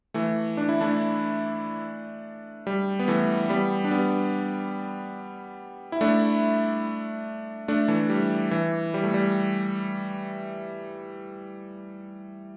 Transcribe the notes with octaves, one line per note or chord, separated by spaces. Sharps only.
E3 A3
D4
E4
A3 D4
G3
B3
E3 A3
G3 B3
D4
G3 B3
E4
A3 D4
A3 D4
E3 A3
G3
E3
G3
A3
G3